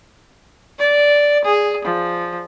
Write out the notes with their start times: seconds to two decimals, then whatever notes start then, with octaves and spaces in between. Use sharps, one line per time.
0.79 D5
1.44 G#4
1.85 F3